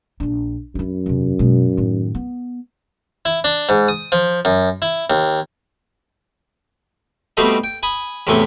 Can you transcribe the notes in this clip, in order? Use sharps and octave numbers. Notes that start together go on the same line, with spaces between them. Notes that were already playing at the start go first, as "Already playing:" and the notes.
A#1 D4
F#2 D#4 E4
E2 C3
B2 G#3
A2 D#3
B3
E4
D4
G#2
D#6
F3
F#2
E4
D#2
B2 G3 A3 C4 D#4
G5
G#5 B5 D#6
E2 A2 C3 A3 A4 G#5